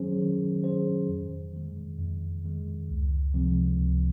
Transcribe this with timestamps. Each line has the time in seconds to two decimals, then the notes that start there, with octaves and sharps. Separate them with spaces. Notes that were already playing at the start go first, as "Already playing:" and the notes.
Already playing: D#3 F#3 C#4 G#4 C5
0.18 D#3
0.64 F#3 C#4 G#4 C5
1.09 F2
1.53 D#3 G#3
1.98 F2
2.44 D#3 G#3
2.89 C#2
3.34 C3 F3 G#3 C4
3.79 C#2